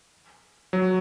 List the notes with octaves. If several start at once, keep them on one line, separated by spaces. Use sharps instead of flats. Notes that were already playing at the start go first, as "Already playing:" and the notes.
F#3